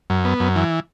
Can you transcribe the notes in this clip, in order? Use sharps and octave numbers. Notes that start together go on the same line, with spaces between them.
F#2
B3
F#2
E3